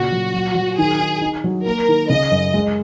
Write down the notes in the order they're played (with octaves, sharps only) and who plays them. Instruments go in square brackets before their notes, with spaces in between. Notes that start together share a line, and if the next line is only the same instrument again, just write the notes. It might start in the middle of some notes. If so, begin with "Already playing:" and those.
Already playing: [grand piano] A#2 C#3 [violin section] F#4
[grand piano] F#3
F#3
F#3
[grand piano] D#3 [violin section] G#4
[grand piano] D#4
D#4
F#3
[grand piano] A#3 [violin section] A#4
[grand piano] D#3
[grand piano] C#3 [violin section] D#5
[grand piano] F#2
G#3